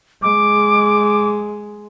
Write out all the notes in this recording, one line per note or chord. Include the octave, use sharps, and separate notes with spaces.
G#3 D6